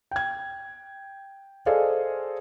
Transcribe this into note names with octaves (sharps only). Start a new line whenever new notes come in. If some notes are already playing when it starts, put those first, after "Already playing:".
G5 G#6
G#4 A4 C5 D5 D#5 F5